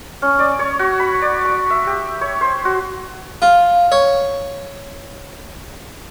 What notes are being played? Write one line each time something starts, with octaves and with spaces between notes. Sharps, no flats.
C#4
D5
C#5
F#4
B5
D5
C#6
E5
G4
C#5
C5
F#4
F4
C#5